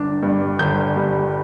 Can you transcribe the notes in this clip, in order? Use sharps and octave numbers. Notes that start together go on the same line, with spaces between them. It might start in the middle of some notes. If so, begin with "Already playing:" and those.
Already playing: G1 D4
G2
G1 G6
G3